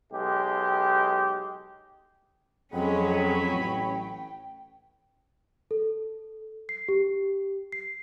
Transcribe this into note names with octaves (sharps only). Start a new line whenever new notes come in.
B1 G#3 G4
F2 F#3 G#3 C#4 G5 B5
A1 G5
A4
C7
G4
C7